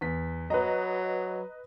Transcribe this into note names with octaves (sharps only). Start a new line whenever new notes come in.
E2 B6
F#3 B4 D#5 A#5